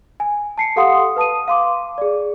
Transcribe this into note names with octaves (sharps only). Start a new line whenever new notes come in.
G#5
A5 C7 C#7
G4 A4 F5 F#5 C6 D#6
B4 A5 D#6 D#7
F5 C6 D6
G#4 D5